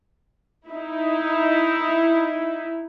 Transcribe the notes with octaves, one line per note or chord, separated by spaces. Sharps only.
D#4 E4